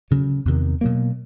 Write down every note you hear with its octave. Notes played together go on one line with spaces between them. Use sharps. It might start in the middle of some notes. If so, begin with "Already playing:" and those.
D2 C#3 F#3
E2 C3 D#3
B2 F#3 A#3